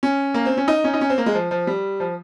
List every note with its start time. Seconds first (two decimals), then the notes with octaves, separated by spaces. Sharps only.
0.03 C#4
0.34 A#3
0.46 C4
0.57 C#4
0.68 D#4
0.84 C#4
0.94 D#4
1.01 C#4
1.10 C4
1.18 A#3
1.26 G#3
1.34 F3
1.51 F3
1.67 G3
2.00 F3